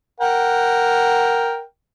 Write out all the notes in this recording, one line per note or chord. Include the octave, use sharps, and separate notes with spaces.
A#4 F#5 G5